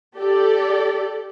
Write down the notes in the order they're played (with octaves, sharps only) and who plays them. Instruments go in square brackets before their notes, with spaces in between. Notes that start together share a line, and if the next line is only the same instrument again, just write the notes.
[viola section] G4 A4 D5